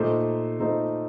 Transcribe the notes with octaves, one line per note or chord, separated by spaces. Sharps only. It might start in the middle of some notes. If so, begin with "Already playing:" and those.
Already playing: A#2 A3 D#4 A4 C5
A#2 A3 D#4 A4 C5